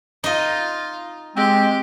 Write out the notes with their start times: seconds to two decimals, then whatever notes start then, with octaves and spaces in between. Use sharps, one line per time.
0.24 D#4 F4 D#5
1.36 G#3 C4 G4